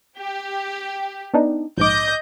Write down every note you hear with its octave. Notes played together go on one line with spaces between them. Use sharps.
G4
B3 D4 D#4
A#1 G#2 D#5 D6 G6